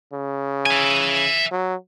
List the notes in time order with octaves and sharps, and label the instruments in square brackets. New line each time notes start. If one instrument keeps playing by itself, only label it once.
[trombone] C#3
[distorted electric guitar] E5 G#5
[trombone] F#3